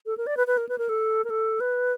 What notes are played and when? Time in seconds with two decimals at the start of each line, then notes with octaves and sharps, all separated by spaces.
0.06 A4
0.17 A#4
0.27 D5
0.37 B4
0.47 B4
0.57 A#4
0.69 B4
0.78 A#4
0.89 A4
1.24 A#4
1.30 A4
1.60 B4